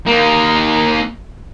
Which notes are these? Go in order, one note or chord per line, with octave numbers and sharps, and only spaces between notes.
A#3 D#4